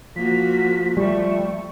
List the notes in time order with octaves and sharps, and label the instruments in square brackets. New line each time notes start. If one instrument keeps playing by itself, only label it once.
[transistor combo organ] F3 [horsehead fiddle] A#3 F#4 [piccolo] B6
[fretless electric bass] G3 [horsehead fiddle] A3 [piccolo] C#6